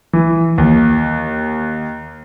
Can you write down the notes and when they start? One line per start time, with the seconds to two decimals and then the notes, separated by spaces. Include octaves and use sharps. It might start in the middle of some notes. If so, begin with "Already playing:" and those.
0.13 E3
0.58 D#2